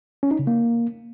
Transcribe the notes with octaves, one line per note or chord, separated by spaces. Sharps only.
C#4
D#4
C#3
A#3